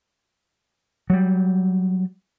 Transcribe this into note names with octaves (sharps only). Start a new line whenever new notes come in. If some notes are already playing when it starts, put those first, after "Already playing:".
F#3 G3